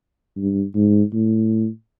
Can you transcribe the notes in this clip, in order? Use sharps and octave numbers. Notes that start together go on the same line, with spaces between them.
G2
G#2
A2